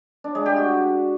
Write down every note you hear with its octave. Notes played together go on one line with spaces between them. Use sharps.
D4
G#3
G4
F#4